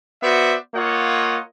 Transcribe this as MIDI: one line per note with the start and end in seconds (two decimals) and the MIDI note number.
0.23 0.54 59
0.23 0.54 66
0.23 0.54 72
0.23 0.54 74
0.23 0.54 76
0.74 1.40 58
0.74 1.40 65
0.74 1.40 73
0.74 1.40 75
0.74 1.40 78